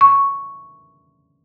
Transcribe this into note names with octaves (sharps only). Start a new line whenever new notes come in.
C#6